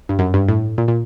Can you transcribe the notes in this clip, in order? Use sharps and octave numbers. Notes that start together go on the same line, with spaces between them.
G2
F#2
G2
A2
A#2
A#2